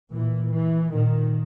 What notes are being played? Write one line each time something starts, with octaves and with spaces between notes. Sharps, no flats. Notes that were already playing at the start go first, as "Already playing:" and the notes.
A#2 E3
E3
A#2 D#3